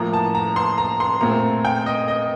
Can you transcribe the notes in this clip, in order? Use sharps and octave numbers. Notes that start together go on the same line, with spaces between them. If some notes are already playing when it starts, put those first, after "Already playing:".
Already playing: A2 F3 A#3 A#5
A5
A#5
C6
A#5
C6
A#2 A3 C4 A#5
G5
D#5
D#5